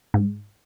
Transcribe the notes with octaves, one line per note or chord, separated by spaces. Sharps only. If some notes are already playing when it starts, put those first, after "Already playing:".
G#2